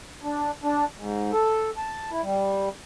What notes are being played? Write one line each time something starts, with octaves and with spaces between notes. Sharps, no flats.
D4
D4
G#2
A4
A5
E4
G3